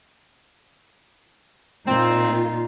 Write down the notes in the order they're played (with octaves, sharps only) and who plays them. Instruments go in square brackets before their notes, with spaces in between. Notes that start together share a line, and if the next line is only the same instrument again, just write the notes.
[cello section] A#2 F4 [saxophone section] C4 [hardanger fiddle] D#4